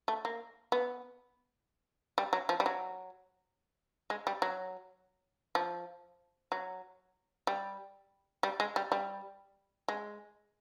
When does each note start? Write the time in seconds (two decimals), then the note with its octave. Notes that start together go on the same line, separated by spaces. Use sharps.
0.08 A3
0.25 A#3
0.72 B3
2.18 G3
2.33 F#3
2.49 F3
2.60 G3
2.66 F#3
4.10 G#3
4.27 G3
4.42 F#3
5.55 F3
6.52 F#3
7.47 G3
8.43 G3
8.60 G#3
8.76 G3
8.92 G3
9.88 G#3